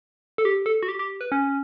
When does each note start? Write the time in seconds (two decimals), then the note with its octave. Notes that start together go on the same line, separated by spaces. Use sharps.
0.38 A4
0.45 G4
0.66 A4
0.83 F#4
0.88 G4
0.99 G4
1.21 B4
1.32 C#4